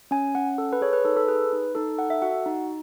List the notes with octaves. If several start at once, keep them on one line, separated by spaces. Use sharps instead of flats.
C#4 G#5
C#4 F#5
A4
B4
G#4 C#5
B4
D#4 A4
A4
G#4 B4
D#4
D#4 A4
A4 F#5
E5
F#4 F#5
D#4